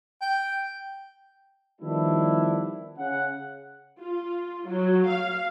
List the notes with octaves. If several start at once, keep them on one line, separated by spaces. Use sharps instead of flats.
G5
D#3 F3 G3 B3 D4 E4
C#3 F#5
F4
F#3
F5